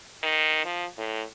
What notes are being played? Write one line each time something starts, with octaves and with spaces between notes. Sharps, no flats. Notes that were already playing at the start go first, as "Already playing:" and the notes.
D#3
F3
A2